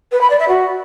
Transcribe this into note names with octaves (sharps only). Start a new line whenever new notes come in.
B4
B5
D5
E5
F#4